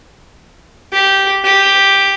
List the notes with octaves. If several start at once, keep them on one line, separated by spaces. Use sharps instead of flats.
G4
G4